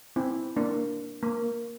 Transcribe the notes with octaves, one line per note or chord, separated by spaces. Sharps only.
C4 E4
A#3 D4
A#3